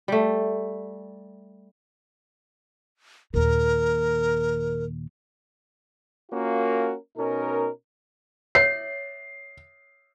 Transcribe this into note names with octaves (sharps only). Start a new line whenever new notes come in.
G3 A3
D#2 A#2 A#4
A#3 C#4 F4 F#4 A#4
B2 C#4 D#4 A#4
C#5 E5 C7